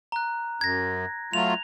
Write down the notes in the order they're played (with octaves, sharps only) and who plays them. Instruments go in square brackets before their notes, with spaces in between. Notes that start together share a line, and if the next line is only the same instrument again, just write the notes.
[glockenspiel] A#5 F#6
[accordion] F#2 [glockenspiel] G#6 A#6
[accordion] F#3 A3 F4 [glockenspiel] F7